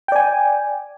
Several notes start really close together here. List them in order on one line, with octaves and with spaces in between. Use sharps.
G5 D5 G#5